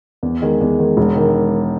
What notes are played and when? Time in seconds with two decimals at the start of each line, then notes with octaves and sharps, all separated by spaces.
0.23 E2
0.42 D#3 G#3
0.61 E2
0.79 D#3 G#3
0.97 E1
1.15 D#3